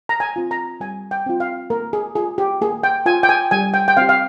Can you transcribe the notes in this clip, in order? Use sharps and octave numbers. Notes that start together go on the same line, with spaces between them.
A#5
G#5
C4 F4
A#5
G3 G#5
G5
C4 F4
F5
A#3 A#4
G#4
F4 G#4
G4
A#3 G#4
G5
F4 G#5
G5
G#5
G3 G#5
G5
G5
C4 G4 F5
F5